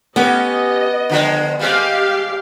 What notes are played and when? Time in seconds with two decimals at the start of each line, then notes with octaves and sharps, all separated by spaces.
0.16 B3 C#4 G4 D#5
1.09 D3 F3 G#3
1.59 G3 G#3 C4 G4 F5